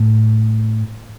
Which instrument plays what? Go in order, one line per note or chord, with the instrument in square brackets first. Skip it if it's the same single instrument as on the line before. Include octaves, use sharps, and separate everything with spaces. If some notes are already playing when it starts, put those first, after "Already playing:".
Already playing: [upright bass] A2